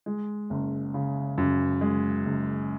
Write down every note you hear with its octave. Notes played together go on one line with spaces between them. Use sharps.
G#3
F#1
C#3
F#2
G#3
F#1